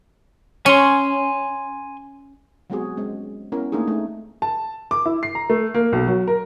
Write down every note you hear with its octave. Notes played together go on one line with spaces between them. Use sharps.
C#4 G#5 C6
F#3 G#3 B3 C4 F#4 G#4
G#3 C4 C#4
B3 C#4 E4 A#4
A3 A#3 D4 D#4 G#4
A3 C4 D#4
A5
D6
E4
C7
A#5
A3
A#3
B1
F#3
A#4